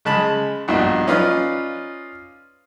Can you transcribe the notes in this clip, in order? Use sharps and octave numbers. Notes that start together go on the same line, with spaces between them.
C#3 G#3 A5 B5
A#1 G2 B2 D#4
C#4 D#4 F4 B4 D5 F5